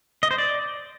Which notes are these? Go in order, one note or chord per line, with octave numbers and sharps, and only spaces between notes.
D#5
C5
D5